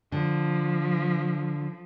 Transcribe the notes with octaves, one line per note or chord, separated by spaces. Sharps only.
D3 F3